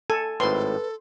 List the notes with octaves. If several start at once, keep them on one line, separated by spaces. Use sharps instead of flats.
A4 G#5
G#1 A2 A4 B4 C6